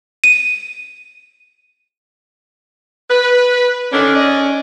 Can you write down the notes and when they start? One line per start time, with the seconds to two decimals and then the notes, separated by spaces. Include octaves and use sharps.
0.24 D#7
3.10 B4
3.92 D3 D#3 C#4 D4
4.15 D5 D#5